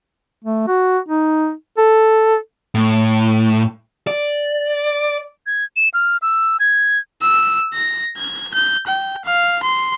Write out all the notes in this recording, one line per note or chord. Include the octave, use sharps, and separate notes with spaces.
A3
F#4
D#4
A4
A2
D5
G#6
E7
F6
E6
G#6
E6
A#6
G#6
G6
G5
F5
C6